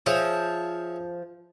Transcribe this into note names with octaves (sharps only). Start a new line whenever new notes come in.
F3 G#4 C#5 E5